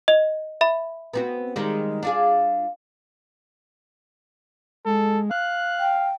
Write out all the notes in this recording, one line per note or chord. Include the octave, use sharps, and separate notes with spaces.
D#5 F7
E5 B5
B3 C4 F#4
D#3 G3 G#3
D4 F4 G#4
G#3 A4
F5 F#6
G5